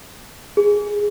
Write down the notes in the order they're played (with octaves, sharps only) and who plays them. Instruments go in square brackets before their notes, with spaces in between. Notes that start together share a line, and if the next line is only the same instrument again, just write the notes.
[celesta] G#4